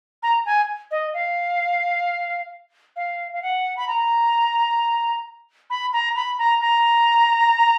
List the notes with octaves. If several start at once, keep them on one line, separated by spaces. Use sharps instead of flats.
A#5
G#5
D#5
F5
F5
F5
F#5
B5
A#5
B5
A#5
B5
A#5
A#5